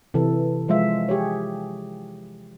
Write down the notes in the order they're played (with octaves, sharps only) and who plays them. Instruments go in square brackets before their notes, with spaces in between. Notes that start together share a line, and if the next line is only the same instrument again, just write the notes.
[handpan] C3 E3 A4
F3 G#3 F4 E5
G4 G#4 C#5